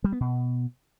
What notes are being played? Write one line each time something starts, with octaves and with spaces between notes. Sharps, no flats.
G3
B3
B2